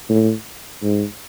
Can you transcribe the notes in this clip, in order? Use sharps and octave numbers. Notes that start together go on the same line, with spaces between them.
A2
G#2